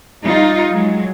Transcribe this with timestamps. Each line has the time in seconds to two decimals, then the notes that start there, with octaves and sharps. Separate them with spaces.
0.22 G3 D#4 F4
0.71 F#3 G#3